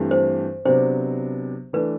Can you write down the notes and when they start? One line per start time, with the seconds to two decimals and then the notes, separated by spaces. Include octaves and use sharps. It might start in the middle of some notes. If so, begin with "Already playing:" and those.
Already playing: G2 E3 A3 C4 G4
0.11 C5
0.65 C3 F#3 B3 D4 G4 C5
1.73 E3 A3 D4 B4